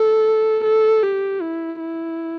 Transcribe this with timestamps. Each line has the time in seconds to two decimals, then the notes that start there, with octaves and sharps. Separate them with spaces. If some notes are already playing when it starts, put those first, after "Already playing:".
Already playing: A4
0.64 A4
1.03 G4
1.41 E4
1.80 E4